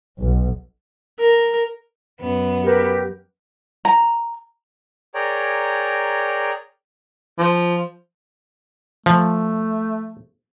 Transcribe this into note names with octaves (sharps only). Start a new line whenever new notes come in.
B1
A#4
F#2 B3
G4 A#4 B4
A#5
G#4 A#4 C#5 D5 G5 A#5
F3
F3 A3